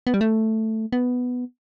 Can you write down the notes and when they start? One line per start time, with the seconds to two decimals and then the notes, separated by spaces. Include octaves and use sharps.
0.07 B3
0.14 G3
0.21 A3
0.92 B3